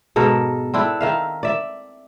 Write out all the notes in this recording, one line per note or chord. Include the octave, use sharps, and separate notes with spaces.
G#2 B2 A4 A#4
C4 D4 E4 A4
D#3 E5 F5
D5 E5